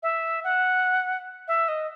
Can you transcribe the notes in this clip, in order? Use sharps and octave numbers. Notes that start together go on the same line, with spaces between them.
E5
F#5
E5
D#5